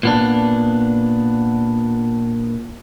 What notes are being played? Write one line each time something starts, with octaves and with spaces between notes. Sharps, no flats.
A#2 B3 D4